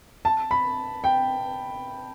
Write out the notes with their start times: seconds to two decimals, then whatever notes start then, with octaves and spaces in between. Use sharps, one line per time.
0.25 A5
0.51 B5
1.04 G5